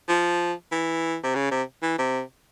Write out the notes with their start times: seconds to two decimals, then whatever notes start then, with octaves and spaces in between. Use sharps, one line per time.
0.09 F3
0.72 E3
1.24 C3
1.35 C#3
1.51 C3
1.83 E3
1.98 C3